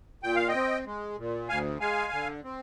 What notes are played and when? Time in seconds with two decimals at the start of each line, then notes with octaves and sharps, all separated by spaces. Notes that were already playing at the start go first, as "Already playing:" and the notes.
0.23 A#2 G5
0.36 F5
0.48 D#5 G5
0.55 C4
0.86 G#3
1.18 A#2
1.49 D2 F5 G#5
1.80 G#3 F5 G#5
2.12 D3
2.44 C4